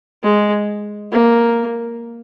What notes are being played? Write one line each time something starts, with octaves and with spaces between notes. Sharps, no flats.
G#3
A#3